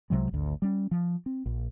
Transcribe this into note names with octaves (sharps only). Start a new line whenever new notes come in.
C2 C3 F#3 G#3
G#1 D2
G3 C#4
F3
C4
A#1